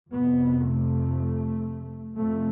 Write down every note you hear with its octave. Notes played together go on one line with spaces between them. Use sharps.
F2 C3 B3
A3
F2 C3 A3